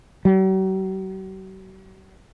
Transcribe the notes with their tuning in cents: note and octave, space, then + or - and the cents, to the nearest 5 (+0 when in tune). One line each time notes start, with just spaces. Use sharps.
F#3 +45